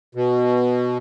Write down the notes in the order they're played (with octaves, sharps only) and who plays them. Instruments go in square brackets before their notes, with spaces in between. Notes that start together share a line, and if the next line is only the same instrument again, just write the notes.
[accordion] B2